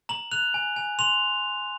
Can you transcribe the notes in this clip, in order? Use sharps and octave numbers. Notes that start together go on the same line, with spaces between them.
A#5 F#7
F#6 F7
G#5
G#5
C6 F7